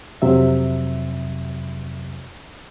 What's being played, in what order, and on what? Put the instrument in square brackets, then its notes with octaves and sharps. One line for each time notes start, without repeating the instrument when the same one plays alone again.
[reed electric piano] F2 C3 F#3 E5